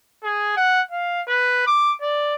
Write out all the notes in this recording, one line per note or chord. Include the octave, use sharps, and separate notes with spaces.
G#4
F#5
F5
B4
D6
D5